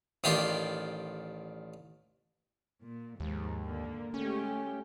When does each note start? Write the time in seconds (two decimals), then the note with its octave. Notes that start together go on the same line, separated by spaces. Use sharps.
0.24 A1 D#3 F4 G4 D5 C6
2.82 A#2
3.20 D#2 G#2 F3
3.64 D3 A#3
4.14 G#3 A3 C#4 G4